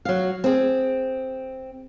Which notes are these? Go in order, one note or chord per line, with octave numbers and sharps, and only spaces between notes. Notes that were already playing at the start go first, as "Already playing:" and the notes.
F#3 F5
C4 G#4